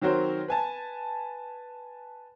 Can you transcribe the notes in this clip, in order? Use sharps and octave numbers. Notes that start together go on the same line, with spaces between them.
D#3 F#3 C4 F#4 A#4 C5
B4 G#5 A5